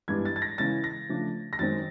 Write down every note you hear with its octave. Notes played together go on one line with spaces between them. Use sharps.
G2 E3 G#3 B3 D4 G#6
A6
A6
A#6
C#3 E3 G#3 C#4 A6
A#6
C#3 F3 A3 D4
A#6
F#2 D#3 G#3 C4 A6